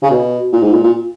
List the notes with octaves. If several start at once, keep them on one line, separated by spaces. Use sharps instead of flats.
C#3
B2
A#2
G#2
A#2
A#2